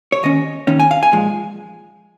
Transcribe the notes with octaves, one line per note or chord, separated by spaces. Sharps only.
C#5
D#2 D#3 C#4 D#5
D#2 D#3 C#4
G#5
F5
G#5
A#2 F3 G#3